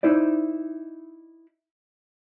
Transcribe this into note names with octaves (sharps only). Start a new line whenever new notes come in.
D#4 E4 C5 D5